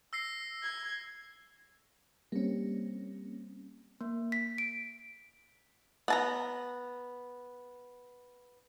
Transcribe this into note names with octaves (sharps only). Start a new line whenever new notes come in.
E6 A#6 C7
G#6
G3 A#3 C4 C#4
A#3
B6
D7
B3 A5 A#5